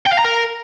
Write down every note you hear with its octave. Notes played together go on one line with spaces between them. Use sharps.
G5
F5
A#5
A#4